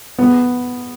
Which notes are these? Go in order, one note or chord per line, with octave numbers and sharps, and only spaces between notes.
B3